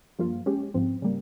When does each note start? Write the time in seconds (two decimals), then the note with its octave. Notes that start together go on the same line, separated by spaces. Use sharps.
0.19 G2 F3 A#3 F4
0.46 G#3 C#4 G4
0.74 G#2 F3 C4
1.02 C#3 G3 A#3